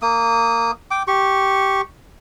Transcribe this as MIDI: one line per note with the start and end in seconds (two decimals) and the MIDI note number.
0.02 0.71 58
0.02 0.71 87
0.91 1.03 79
0.91 1.03 86
1.08 1.81 67
1.08 1.81 85